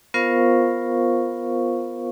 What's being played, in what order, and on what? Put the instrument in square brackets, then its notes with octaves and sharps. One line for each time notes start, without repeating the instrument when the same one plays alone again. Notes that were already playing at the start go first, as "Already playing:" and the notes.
[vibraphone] B3 F4 A#4 C5 F5 C#6